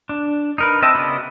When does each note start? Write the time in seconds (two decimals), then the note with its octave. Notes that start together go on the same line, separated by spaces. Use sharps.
0.09 D4
0.58 D#4 A#4 B4
0.82 C4 D#5 E5 G5 A5
0.94 C#3 B3 F#4 D5 D#5